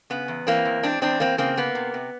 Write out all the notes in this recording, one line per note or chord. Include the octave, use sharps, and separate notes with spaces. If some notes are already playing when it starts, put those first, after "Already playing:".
C#3 B3
E2
E3 A#3 C4
E2
G#3 C4 D4
E2 C4 D4
E3 A#3 C4
C#3 A#3 C4
A#3 B3
C3
C3